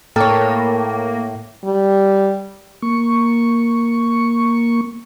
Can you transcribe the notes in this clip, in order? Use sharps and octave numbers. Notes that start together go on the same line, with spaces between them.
A2 A#3 A4 C#5 G5 D6 F6
G3
A#3 C#6